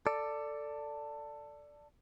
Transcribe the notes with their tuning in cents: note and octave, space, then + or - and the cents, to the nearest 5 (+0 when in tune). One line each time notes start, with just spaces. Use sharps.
A4 +15 D5 +0